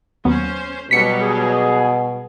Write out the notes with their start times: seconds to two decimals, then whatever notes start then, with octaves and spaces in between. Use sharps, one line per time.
0.25 D#2 F#3 B3 C#4 C5
0.91 B2 F#3 G3 B6 C#7
1.23 G#4